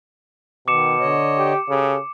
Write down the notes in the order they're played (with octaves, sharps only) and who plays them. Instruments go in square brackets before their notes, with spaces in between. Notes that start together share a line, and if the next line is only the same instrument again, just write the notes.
[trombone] B2 [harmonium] D#3 [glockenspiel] D6 C#7 E7
[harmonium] D3 C#5 D#5
[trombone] G4
[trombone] C#3 [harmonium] G4 A4